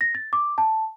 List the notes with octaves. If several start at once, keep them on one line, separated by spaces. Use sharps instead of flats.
A#6
A6
D6
A5